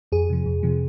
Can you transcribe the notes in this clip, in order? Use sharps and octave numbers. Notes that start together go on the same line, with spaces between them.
F2 G#4
C3 F3
F2
C3 F3